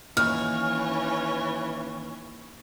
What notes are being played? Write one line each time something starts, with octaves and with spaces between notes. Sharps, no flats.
D#2 E3 C#4 C#5 F6